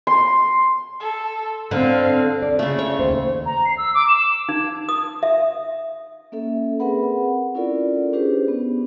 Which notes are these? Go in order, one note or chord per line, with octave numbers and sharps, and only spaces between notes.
C6
A4
D3 C4 F5
D5
C#3 A3
C#5
D#2 C5
A#5
C7
E6
D6
E7
D#4
D#6
E5
A#3 C#4 A4 E5
C4 G#4 A#4 B4 F#5 B5
C#4 E4 F4 A4 A#4 D5
C#4 D4 G4 G#4 B4 C5
B3